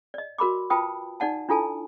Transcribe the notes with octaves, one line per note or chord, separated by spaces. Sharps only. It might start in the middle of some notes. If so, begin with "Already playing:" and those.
D5 D#5
F#4 A#4 B5 D6
F4 B4 G5 A5 B5 D#6
D#4 D5 F#5 A5
D4 E4 F4 A4 G#5 A5